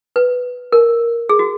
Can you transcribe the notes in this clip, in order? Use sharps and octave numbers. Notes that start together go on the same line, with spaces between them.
B4
A#4
G#4
F#4